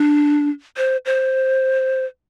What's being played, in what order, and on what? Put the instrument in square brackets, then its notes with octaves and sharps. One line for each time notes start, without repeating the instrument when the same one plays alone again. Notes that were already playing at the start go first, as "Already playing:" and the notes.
Already playing: [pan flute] D4
C5
C5